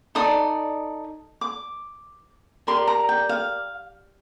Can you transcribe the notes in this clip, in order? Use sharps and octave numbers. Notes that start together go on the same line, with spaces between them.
D#4 A4 D5 D#6
D6
G4 A#4 D5 C6
A#5
G5
F5